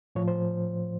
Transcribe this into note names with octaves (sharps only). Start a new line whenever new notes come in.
A2 F3 C#5
C5